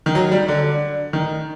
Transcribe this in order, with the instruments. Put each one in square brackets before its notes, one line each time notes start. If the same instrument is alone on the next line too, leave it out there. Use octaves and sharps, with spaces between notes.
[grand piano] D#3
F#3
G3
D3
D#3